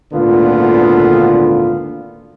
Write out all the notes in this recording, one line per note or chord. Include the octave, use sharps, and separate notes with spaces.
G#1 D2 A#2 D3 B3 F4